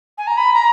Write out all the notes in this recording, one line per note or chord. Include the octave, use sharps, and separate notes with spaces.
G#5
A#5
B5
A#5